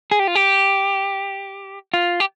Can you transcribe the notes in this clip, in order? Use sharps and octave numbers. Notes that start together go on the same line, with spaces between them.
G#4
G4
F4
G4
F4
G4